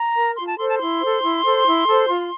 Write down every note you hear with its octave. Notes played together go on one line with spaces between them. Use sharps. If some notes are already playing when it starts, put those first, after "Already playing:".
Already playing: A#5
A#4
F4 C6
A5
A4 C5 C6
A5
E4 C6
A4 C5
E4
A4 C5
E4
A4 C5
F4